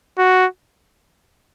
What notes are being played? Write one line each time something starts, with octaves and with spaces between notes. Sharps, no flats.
F#4